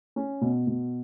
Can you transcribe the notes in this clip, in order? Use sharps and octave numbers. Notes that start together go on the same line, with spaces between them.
C#4
B2
B2